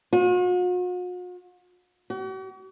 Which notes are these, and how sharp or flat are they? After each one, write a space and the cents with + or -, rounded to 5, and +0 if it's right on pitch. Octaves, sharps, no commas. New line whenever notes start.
F#4 -45
F#4 +45